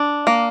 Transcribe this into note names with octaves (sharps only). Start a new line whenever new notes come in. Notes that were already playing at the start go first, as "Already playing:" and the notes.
Already playing: D4
A#3